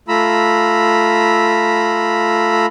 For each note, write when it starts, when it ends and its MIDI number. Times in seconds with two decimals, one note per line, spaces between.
0.08 2.66 57
0.08 2.66 65
0.08 2.66 82
0.08 2.66 83
0.08 2.66 88